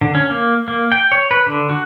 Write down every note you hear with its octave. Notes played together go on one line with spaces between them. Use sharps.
D3
C#4
A#3
A#3
G5
C#5
B4
D3
F#4